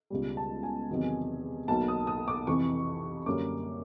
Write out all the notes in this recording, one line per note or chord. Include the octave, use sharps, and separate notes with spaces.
C#2 B2 G3
A5
G#5
E2 C3 D#3 F#3
B1 B2 F#3 A#3 A5
D#6
D#6
D6
F2 C3 E3 C#6
F#2 D3 G3 A#3 C#4 D6